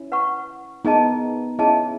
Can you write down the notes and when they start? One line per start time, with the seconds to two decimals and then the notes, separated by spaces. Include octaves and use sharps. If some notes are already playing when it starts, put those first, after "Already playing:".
Already playing: C#4 E4
0.12 B4 F#5 C#6
0.85 B3 D#4 G#4 D#5 A5
1.59 C#4 E4 G#4 D#5 A5